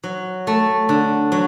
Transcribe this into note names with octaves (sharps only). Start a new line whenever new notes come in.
F#3
A3
D3
F#3